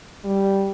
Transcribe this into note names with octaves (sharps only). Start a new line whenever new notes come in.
G3